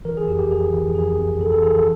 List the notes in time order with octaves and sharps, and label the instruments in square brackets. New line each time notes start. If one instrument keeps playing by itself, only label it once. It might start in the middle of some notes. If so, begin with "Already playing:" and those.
[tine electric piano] E3 A#4
G#4
F2 G4
G4
F2 G#4
E3
F2 G#4
F2
F2 A4
A4
E3 G#4
A4